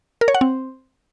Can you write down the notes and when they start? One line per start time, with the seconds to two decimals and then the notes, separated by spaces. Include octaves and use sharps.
0.21 A#4
0.28 C#5
0.35 F#5
0.41 C4